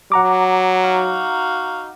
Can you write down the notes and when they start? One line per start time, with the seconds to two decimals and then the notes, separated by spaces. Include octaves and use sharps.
0.12 F#3 F#5 A#5 D6
0.83 D#4 F#4 F5